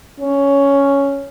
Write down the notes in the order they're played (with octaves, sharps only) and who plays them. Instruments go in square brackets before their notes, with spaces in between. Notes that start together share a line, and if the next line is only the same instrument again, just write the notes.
[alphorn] C#4